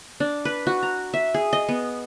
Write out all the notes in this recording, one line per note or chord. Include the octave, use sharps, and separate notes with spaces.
D4
B4
F#4
A#5
E5
G#4
D#5
B3